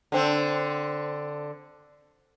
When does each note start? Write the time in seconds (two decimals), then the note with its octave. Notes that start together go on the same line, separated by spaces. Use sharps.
0.12 D3 C4